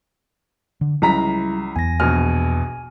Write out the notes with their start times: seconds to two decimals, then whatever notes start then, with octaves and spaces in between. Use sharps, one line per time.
0.81 D3
1.02 C#2 F#3 G3 E4 A#5 B6
1.76 E2 B3 G#5 A#6
2.00 A#1 B2 G#5 F6